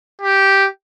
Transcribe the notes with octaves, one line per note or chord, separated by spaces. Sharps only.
G4